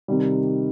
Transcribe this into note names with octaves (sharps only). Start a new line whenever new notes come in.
C3 D#3 G3